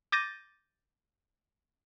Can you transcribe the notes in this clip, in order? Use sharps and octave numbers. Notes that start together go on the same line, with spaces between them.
D6 G6 A6 A#6 D#7